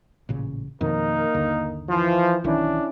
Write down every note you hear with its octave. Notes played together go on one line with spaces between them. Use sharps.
A1 A#2 C#3
F2 B2 D#3 A#3 D#4 A#4
G1 D#2 D3
E3 F3
B1 D#3 E3 C#4 D4 E4